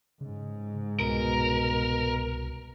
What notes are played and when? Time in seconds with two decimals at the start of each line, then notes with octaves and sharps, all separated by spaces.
0.21 G#2 C#3
1.00 C2 B2 A#4